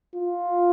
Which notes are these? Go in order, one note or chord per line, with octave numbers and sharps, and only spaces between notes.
F4